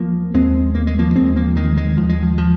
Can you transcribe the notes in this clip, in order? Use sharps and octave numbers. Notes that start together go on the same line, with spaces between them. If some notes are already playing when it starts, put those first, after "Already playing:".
Already playing: D#2 F3 A#3
D#2 G#3 C4
A#3
G#3
F3 A#3
D#2 G#3 C4
F3 A#3
D#3 G#3
D#3 G#3
D#2 F3
G#3
F3
F3